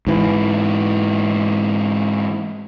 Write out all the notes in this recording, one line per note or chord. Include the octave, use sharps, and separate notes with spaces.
G#2 E3